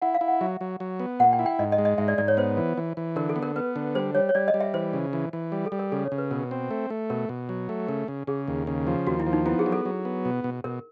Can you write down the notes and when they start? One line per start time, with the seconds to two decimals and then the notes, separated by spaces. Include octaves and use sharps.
0.02 E4 F#5
0.14 F5
0.21 E4
0.28 F#5
0.41 F#3 E5
0.61 F#3
0.80 F#3
1.00 B3
1.19 A#2 F#5
1.33 G5
1.39 E4
1.46 G5
1.59 G#2 D#5
1.72 D#5
1.78 G#3
1.85 D#5
1.98 G#2 E5
2.08 D5
2.18 G#2 D5
2.28 C#5
2.37 B3 C5
2.57 E3
2.77 E3
2.97 E3
3.16 D3 A#4
3.29 A4
3.36 B3
3.42 A#4
3.56 B3 B4
3.76 D3
3.95 G3 C5
4.15 G3 C#5
4.29 C#5
4.35 G3 D5
4.48 D#5
4.54 G3
4.61 E5
4.74 E3 C5
4.93 C#3
5.13 E3
5.33 E3
5.52 G3
5.66 A4
5.72 G3
5.79 A#4
5.92 C#3 A4
6.05 C#5
6.12 C#3
6.18 B4
6.31 B2 A#4
6.51 C4
6.71 A3
6.90 A3
7.10 B2 A#4
7.29 B2
7.49 F#3
7.69 A3
7.88 C#3 A#4
8.08 C#3
8.27 C#3 G#4
8.48 D#2
8.67 C#3
8.87 F3
9.07 D#2 F#4
9.20 E4
9.26 F3
9.33 D#4
9.46 B3 E4
9.59 G#4
9.66 F#3
9.72 A4
9.85 F#3
10.05 B3
10.25 B2
10.44 B2
10.64 B2 A#4